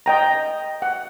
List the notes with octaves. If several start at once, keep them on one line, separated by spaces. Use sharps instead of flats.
D#5 G5 A#5
F#5